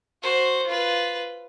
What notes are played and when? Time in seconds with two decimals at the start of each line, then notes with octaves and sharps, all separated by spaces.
0.23 F#4 C5
0.67 F4 B4